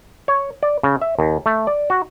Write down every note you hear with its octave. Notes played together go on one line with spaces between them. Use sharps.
C#5
D5
C#3
E5
D#2
A3
D5
F#4